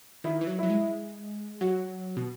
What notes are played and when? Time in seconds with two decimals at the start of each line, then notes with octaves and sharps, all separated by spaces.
0.24 D#3 E4
0.41 E3
0.47 F#3
0.59 F#3 E4
0.70 G#3
1.61 F#3 F#4
2.17 B2